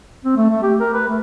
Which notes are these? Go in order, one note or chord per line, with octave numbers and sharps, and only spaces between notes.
C4
A3
A3
G4
A#4
B4
A3